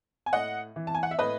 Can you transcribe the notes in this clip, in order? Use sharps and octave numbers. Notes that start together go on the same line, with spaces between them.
G#5
A2 D#5 F#5
E3
A5
G#5
F#5
E5
A2 B4 D#5